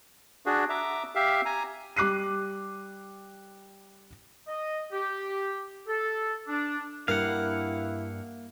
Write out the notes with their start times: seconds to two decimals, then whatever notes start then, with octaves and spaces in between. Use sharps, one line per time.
0.46 D4 F#4 G#4
0.70 E5 A#5 D6
1.15 G4 E5 F5
1.45 G#5 A#5
1.96 G3 D6 F#6 C7 D#7
4.47 D#5
4.92 G4
5.88 A4
6.47 D4
7.08 G2 A#3 E4 F5 F#5